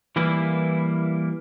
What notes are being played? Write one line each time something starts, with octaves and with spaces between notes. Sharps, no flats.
E3 G3 A#3 E4 B4